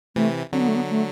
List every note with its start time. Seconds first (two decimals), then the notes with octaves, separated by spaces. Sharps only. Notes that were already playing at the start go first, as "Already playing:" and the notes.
0.16 C3 E3 A3
0.53 D3 F#3 C4
0.60 B3
0.68 A3
0.75 B3
0.90 A3